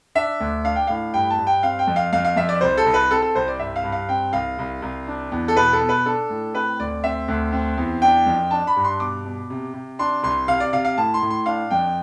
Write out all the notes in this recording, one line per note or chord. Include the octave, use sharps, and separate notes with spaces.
D4 E5
D2
D4 F5
G5
A2 F5
G2 G5
A5
G2
G5
C4 F5
G5
F2
F5
F2 F5
F5
F2 E5
D5
C2 C5
A4
C2
B4
C4 A4
A4
C2 C5
D5
G2 E5
F5
G2
F5
C4 G5
C2 F5
C2
C2
D4
E2
A4
B2 B4
A4
B2
B4
D4 A4
A2
C4 B4
D2 D5
C4 E5
D2
C4
E2
D4 G5
F2
D4 A5
B5
G2
C6
B2 D6
B2
C3
C3
D4 C6
C2 C6
C3 F5
D5
C3 F5
F5
A2 A5
C6
A2
C6
D4 F5
F2 G5